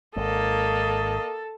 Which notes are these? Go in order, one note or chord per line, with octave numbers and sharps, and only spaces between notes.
G#1 G#2 A#3 A4 D#5